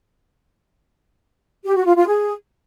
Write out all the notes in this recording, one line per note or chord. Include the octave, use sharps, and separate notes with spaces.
G4
F#4
F4
F4
G#4